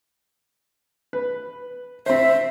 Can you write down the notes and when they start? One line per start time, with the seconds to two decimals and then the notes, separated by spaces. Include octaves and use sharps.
1.13 B4
2.06 C4 C5 E5